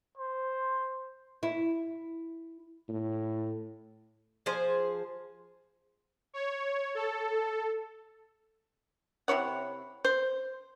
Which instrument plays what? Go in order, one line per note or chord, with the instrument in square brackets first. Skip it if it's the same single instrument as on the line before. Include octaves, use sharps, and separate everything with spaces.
[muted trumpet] C5
[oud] E4
[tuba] A2
[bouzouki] F3 G#4 C5
[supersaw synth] C#5
A4
[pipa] C3 E4 C#5 F#5
C5